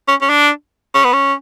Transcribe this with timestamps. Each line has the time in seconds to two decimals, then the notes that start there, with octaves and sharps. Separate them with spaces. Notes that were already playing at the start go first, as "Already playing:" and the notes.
0.08 C#4
0.22 C#4
0.29 D4
0.95 C#4
1.04 B3
1.13 C#4